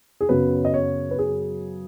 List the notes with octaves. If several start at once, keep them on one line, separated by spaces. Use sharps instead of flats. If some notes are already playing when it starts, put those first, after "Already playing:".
G#4
F#2 C#3 F#3 B3 B4
D#5
C#5
B4
G#4